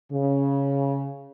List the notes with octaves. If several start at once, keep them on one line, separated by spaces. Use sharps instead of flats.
C#3